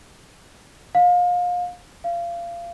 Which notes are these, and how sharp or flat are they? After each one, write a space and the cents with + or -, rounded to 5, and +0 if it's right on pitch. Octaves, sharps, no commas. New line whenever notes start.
F5 +30
F5 -25